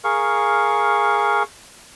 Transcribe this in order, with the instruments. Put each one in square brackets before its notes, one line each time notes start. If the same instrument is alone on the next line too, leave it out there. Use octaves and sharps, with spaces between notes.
[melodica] G#4 A#4 F5 C#6